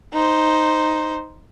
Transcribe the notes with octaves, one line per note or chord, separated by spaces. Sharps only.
D#4 C5